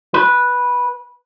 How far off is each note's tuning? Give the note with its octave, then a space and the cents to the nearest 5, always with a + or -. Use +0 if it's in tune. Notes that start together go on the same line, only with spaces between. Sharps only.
B4 -10